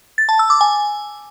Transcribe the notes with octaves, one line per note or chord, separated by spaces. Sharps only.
A6
A5
E6
D6
G#5